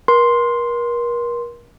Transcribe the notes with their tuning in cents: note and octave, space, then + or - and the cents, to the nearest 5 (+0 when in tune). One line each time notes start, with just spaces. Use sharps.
A#4 +40 C6 +0